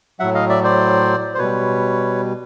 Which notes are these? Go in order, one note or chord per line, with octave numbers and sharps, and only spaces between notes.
A2 F#3 E5 F#5
D#5 F5
D5 E5
C5 D5
C5
B2 G3 B4 C#5